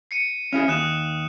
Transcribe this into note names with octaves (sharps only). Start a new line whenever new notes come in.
C7 C#7 D#7
C#4 E4 G#4 F6
D#2 D#6 F#6 E7